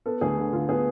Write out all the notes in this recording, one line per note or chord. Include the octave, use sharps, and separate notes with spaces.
B3 A4
D2 G#4
D3
D3 F4
B3 G#4